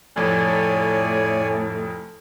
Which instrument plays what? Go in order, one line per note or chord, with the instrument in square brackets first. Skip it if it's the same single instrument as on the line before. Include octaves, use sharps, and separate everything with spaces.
[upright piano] F1 F2 [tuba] A2 [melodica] C#5 D5 G#5